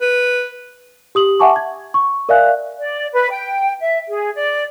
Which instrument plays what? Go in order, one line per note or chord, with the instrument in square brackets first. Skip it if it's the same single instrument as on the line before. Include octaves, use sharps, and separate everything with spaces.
[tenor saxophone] B4
[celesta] G4 D#6 F#7
E5 F#5 G#5 A5 C#6 D6
G#6
C#6
A#4 D5 E5 F5 G#5 F#6
[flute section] D5
B4
G5
E5
G#4
D5